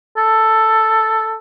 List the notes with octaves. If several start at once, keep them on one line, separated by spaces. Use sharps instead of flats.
A4